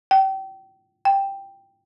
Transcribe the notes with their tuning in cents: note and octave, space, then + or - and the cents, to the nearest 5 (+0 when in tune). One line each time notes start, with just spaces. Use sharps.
G5 -30
G5 +5